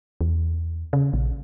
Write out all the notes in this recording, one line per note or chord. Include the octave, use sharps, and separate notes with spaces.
E2
C#3
A#1